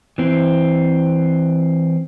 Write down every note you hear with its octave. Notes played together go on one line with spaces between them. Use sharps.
E3 C4